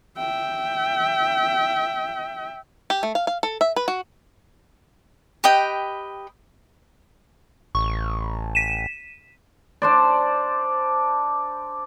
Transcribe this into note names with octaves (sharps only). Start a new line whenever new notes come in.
E5 G5
G4
A3
F5
F5
A4
E5
B4
F#4
G4 B4 D#5 G5
A1 C#6
B6 D#7 E7
D4 C5 D5